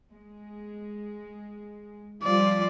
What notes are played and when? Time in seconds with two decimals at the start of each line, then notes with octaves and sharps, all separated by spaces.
0.13 G#3
2.23 F3 G3 F4 D5